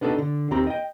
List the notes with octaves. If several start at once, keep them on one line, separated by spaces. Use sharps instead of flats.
B3 D4 D#4 F#4 A4
D3
D#2 D#3 C4 G4 A#5
D#5 G5